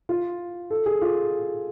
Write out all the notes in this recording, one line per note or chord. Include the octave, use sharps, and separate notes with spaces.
F4
A4
G#4
F4